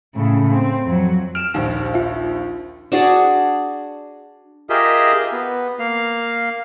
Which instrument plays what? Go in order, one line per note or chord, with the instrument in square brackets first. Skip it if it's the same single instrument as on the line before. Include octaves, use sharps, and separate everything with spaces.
[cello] A2 C#3
C4
F2 F#3
[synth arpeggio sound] F6 [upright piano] D7 E7
[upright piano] A#1 D#2
[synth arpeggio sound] F4 E5
[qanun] D4 F#4 G#4 D5
[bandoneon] F4 G4 G#4 A#4 D#5 E5
B3
A#3 F5